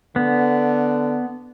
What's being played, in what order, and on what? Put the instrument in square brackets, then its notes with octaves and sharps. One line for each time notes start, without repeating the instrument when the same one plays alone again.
[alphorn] D3 [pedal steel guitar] B3